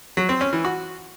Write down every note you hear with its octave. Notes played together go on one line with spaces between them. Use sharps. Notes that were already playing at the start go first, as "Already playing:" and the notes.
F#3
C4
C#4
E3
F#4